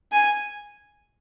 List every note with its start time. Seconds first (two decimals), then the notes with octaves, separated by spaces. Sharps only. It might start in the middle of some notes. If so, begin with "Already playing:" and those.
0.12 G#5